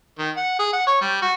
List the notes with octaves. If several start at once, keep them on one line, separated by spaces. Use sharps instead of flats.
D#3
F#5
G#4
F#5
C#5
G3
F#4